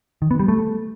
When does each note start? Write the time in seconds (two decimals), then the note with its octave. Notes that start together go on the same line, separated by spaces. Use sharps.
0.22 D#3
0.31 B3
0.39 G3
0.48 A3